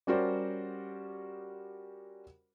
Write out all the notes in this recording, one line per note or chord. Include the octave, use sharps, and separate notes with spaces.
G3 C#4 F#4 A#4 C5 D5